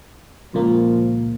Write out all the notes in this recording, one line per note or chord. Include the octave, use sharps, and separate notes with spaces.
C#2 A#2 F3 A#3